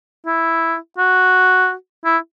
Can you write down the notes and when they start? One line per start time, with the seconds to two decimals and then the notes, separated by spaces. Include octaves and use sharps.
0.26 E4
0.98 F#4
2.05 E4